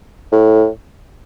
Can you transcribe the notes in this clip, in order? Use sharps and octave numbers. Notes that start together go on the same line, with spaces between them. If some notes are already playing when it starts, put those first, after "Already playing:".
A2